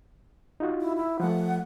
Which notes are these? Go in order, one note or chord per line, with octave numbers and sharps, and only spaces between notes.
D#4 F4 F#4
E4
E4
F3 A3 F#5